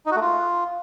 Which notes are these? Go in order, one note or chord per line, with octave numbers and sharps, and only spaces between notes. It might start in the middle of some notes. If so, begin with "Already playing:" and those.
D#4
F#4
A3
F4